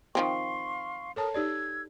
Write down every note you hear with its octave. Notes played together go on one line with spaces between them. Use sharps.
D#3 F3 C4 F5 C6 C#6
A4 A#4 C#5 A5 D#6
D#4 G4 D5 E6 G#6